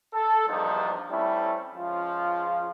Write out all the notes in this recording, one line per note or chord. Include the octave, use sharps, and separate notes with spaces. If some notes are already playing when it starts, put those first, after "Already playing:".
A4
A#1 E2 G2 F3 D4 D#4
G3 A3 C4 C#4 E4
C#2 C#3 F3 F4